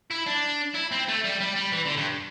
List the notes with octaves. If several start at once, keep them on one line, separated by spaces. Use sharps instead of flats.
E4
D4
E4
C4
A3
G3
G3
G3
E3
D3
G2